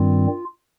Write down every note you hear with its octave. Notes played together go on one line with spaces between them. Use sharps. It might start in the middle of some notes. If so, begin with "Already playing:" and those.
Already playing: G2 D#3 G3 C4 F4